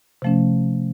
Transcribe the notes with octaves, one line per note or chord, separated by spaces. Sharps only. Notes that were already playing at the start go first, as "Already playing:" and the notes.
C3 F3 A3 C#4